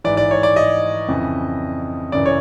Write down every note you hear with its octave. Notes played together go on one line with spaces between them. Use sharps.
G#2 E3 D5
D5
C#5
D5
D#5
F2 C#3 E3
F#2 C#3 E3 D5
C#5